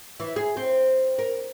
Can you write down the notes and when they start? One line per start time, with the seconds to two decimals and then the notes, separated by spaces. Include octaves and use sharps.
0.20 E3
0.36 G#4
0.57 C4
1.19 A#4